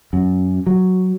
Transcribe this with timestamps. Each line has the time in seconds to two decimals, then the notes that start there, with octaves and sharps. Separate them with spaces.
0.13 F#2
0.66 F#3